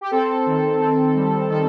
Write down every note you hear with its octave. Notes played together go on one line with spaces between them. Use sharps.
G4
C4 A4
D#3
C4
G3
D#3 A4